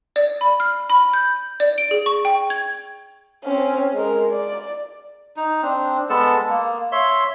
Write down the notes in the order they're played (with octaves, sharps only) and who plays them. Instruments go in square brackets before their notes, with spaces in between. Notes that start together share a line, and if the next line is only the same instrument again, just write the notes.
[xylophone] D5
B5
F6
B5
G6
D5
D7
G#4
C#6
G5
G#6
[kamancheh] C4 C#4
G#3 A#4
D5
[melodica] D#4
C4 D4
G#3 B3 A4 A5
A#3
C#5 E5 C6